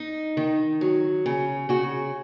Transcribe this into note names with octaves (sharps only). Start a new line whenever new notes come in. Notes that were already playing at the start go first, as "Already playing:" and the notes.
Already playing: D#4
D#3
F#3
C#3
C#3 F#4